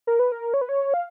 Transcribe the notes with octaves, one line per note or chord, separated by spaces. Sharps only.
A#4
B4
A#4
C#5
B4
C#5
F5